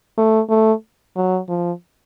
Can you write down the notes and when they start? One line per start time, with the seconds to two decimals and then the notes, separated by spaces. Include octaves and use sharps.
0.18 A3
0.49 A3
1.16 F#3
1.49 F3